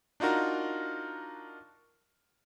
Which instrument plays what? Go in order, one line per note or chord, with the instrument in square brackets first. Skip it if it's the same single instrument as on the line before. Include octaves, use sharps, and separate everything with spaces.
[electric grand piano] D4 D#4 F4 F#4 A#4